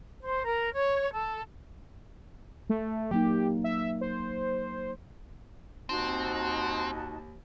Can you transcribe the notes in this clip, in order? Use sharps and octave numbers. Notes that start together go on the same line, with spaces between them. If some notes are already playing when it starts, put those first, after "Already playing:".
C5
A#4
C#5
A4
A3
F#3 A#3 D#4 G4
E5
C5
D#2 C4 D#4 F#4 A5